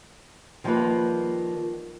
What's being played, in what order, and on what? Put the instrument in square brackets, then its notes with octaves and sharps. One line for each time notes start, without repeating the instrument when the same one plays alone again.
[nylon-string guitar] D#3 F3 G3 A3 A#3 B4